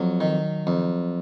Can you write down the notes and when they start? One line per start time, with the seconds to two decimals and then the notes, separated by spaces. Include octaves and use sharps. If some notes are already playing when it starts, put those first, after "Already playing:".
Already playing: F2 F#3
0.21 D#3
0.67 F2